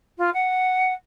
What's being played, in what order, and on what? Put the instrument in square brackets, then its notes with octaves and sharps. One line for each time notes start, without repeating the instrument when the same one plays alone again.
[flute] F4
F#5